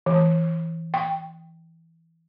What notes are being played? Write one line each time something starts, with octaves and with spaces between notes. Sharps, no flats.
E3
G5